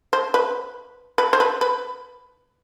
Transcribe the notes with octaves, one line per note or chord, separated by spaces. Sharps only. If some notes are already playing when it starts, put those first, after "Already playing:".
C5
B4
B4
C5
B4
B4